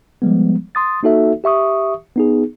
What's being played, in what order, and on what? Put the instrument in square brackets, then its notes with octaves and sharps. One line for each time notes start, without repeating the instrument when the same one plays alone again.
[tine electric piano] F3 G3 G#3 B3
C6 D#6 A6
A#3 D#4 F#4 A4 E5
G4 E5 C#6 D#6
B3 D#4 G#4